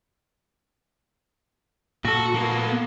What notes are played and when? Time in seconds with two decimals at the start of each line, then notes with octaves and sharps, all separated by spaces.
2.05 A#2 F#4 A4
2.35 A#3 B3